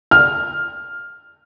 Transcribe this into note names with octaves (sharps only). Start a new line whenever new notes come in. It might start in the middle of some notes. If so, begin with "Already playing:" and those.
F6